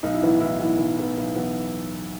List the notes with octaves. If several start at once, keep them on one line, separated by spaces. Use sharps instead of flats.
B1 D#4
E4
A2 E3 B3 D#4
B1 E4
A2 E3 B3
B1
A2 E3 B3
B1
A2 E3 B3